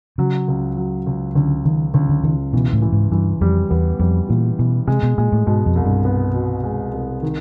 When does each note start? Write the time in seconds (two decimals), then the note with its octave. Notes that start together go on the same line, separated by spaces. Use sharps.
0.18 C#3 F#3
0.48 C#2
0.77 F#3
1.07 C#2
1.35 C#2 D3
1.65 C#2 D#3
1.94 C#2 D3
2.09 D3
2.23 C#2 D#3
2.53 B2 E3
2.73 A2
2.82 E3
2.92 G#2
3.11 G2 E3
3.41 F2 G3
3.70 E2 B3
3.99 F2 G3
4.29 A#2 E3
4.59 B2 E3
4.87 C3 G#3
5.03 B2
5.18 A#2 G#3
5.33 A2
5.46 G#2 B2
5.66 F2
5.75 C2
5.86 G2
6.05 B3
6.34 B2
6.63 G#3
6.93 C2
7.22 D#3